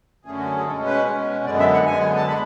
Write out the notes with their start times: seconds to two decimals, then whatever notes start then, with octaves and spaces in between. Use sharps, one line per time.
0.25 F#2 D3 A3 C#4 G#4
0.38 F#4
0.45 G#4
0.57 G#4
0.66 B2 G#3 C#4 A4
0.86 B4
1.05 B2 G#3 C#4
1.46 F#2 D3 G#3 B3 D5
1.60 E5
1.74 F#5
1.86 F#2 D3 G#3 B3 G#5
2.17 A5
2.27 B2 G#3 B3 D4 B5